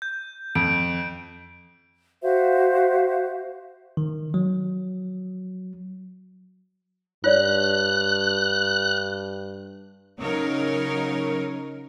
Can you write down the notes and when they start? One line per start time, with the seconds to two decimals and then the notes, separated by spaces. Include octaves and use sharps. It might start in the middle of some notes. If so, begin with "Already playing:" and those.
0.02 G6
0.55 F2 D7
2.22 F#4 C5 E5 F5
3.97 D#3
4.34 F#3
7.24 G2 F4 C#5 D5 F#6
10.19 C#3 F#3 D#4 A#4 C#5